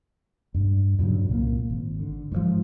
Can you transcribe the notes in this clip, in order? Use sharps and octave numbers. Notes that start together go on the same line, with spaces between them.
G2
G2 A#2 C#3 F#3
C2 A#2 A#3
G#1
D3
G#2 D#3 F3